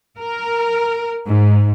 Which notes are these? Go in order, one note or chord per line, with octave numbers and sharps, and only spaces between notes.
A#4
G#2